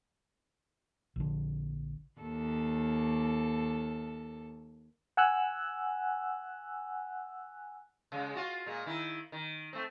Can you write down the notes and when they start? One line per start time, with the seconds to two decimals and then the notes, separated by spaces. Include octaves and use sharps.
1.16 A#1 D3
2.21 D#2 A4
5.17 F#5 G#5 E6 F#6
8.12 C#3 G#3
8.35 F4 F#4
8.66 A#2 G#3
8.86 D#3 E4
9.32 D#3
9.73 A3 C4